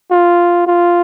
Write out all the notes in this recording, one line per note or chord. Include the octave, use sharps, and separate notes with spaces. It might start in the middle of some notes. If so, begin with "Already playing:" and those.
F4
F4